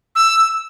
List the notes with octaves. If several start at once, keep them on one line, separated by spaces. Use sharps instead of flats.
E6